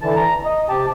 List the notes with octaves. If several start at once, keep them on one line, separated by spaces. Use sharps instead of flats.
D3 E3 A5
A#5
D#5
C3 G4 A5